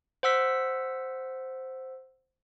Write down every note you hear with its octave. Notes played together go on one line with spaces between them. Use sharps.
C5 F#5 E6 B6